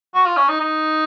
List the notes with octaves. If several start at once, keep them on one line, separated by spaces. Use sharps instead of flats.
F#4
F4
C#4
D#4
D#4